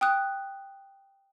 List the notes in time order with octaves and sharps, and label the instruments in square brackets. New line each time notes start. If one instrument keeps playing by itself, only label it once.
[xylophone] G5 D#6 F#6